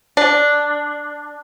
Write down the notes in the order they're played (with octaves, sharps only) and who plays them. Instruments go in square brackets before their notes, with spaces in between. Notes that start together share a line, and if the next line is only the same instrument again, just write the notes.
[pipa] D4